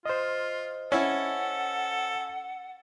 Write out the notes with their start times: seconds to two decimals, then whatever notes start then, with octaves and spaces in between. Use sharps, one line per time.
0.05 F4 C5 D#5
0.92 C#4 E4 A4 F#5